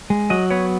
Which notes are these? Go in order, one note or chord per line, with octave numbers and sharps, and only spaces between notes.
G#3
F#3 D#5
B3 C#5